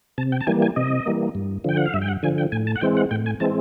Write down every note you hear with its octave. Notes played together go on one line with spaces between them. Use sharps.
C3 A5
G5
A5
E3 G3 A#3 G#5
G#5
C3 D#5
E3 G3 A#3
G2
D3 F3 G5
F#5
F5
G2 E5
G5
F#5
D3 F3 G#5
G5
A2 G#5
A5
F#5
E3 G#3 C4 G5
F#5
A2 G5
G#5
E3 G#3 C4 A5